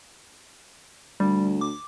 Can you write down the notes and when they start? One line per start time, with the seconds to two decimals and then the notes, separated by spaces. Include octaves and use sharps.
1.20 D2 G3
1.61 D6